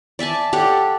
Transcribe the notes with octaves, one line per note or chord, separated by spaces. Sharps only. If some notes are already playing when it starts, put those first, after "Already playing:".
D5 E5 G#5 A5
G4 A4 C#5 F#5